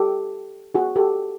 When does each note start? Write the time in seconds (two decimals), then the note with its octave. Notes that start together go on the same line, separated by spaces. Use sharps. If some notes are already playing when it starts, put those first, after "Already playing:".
Already playing: G4 A4
0.74 F#4 G#4
0.96 G4 A4